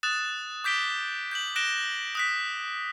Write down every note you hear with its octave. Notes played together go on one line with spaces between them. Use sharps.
D#6 F#6 A6 E7
D6 G6 B6 D7 G7
G6 B6 F#7
F#6 A#6 D7 E7 G7
D#6 F#6 B6